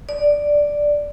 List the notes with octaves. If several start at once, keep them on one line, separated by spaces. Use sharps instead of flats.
D5